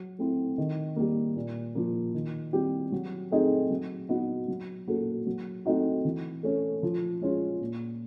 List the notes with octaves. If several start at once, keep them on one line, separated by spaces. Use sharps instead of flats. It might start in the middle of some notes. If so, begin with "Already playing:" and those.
Already playing: F#3
A3 C4 E4
D#3
G3 A#3
A#2
F3 A#3
D#3
G3 C4 E4 G4
F#3
A3 C4 D#4 G#4
F#3
B3 D#4 F#4
F#3
A#3 C#4 F#4 A4
F#3
A3 C4 D#4 F#4
E3
A3 C#4
F3
G#3 C#4 F4
A#2